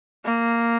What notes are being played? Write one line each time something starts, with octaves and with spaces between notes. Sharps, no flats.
A#3